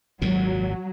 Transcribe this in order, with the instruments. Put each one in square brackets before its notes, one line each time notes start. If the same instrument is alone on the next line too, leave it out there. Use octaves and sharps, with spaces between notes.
[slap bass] G#1 D#2 A#2 [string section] F#3